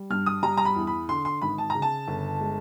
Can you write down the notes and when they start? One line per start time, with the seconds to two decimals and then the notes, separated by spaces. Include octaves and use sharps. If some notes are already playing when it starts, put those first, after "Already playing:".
Already playing: G3
0.10 G2 F6
0.26 D#6
0.43 G3 A#5
0.57 A#5
0.65 B5
0.76 E2
0.87 B5
1.09 D3 C6
1.25 C6
1.42 G#1 B5
1.58 A5
1.70 C#3 A#5
1.82 A5
2.08 G1
2.41 G#3